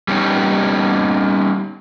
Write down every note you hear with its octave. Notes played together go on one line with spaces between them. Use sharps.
G3 B3 C#4 D#4 G4